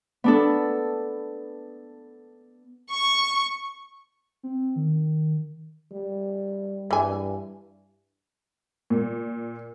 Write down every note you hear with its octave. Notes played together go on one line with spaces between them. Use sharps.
B3 D4 A4
C#6
C4
D#3
G3
G2 E3 G#5
A#2